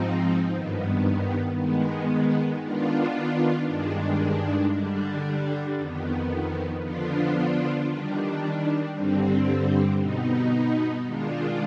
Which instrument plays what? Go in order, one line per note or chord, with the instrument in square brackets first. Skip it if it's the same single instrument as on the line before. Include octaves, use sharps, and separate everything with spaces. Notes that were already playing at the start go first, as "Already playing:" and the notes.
Already playing: [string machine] G#2 F3 C4 D#4
G2 D#3 B3
D#3 G#3 B3
D#3 B3 D4 F4
G2 D#3 G#3 D4
D3 G3 D4
F2 D#3 B3
D3 F3 B3 D4 F4
D#3 G3 D4
G2 D3 G3 C4
B2 B3 D#4
D#3 G#3 D4 F4